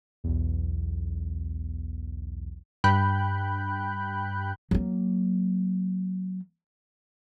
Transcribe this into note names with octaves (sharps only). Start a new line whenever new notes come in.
B1 E2
G2 G5 B5 F#6 G6
F#3 A#3